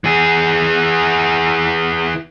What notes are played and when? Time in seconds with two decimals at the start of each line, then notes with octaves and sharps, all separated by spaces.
0.04 E3 G#4